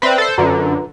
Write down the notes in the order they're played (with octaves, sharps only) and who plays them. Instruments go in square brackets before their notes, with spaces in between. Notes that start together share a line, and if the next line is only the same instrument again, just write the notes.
[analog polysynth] C4 B4 [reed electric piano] D5 E5 B5
[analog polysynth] A4 C5
[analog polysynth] F#2 D3 [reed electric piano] F4 B4 A#5